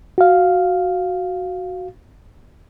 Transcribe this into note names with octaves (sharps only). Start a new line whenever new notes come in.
F#4 F5